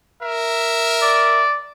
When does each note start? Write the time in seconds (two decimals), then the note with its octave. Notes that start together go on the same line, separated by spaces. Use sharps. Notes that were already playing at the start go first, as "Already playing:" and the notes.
0.22 A#4 E5
1.02 D5